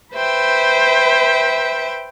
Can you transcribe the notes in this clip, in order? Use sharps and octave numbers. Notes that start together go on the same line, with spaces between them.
B4 C5 E5 G5